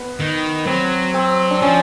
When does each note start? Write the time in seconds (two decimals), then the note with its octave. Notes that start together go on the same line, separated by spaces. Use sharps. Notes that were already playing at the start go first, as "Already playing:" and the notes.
Already playing: B3
0.20 D#3
0.66 F#3 C4
1.14 C4
1.50 D4
1.61 F3 C#4